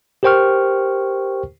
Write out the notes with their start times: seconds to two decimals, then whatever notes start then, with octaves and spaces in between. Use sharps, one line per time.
0.23 G4 A#4 C5 G5 C#6 F6